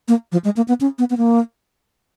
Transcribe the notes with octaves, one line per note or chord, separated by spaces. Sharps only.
A#3
F3
G#3
A#3
B3
C#4
B3
B3
A#3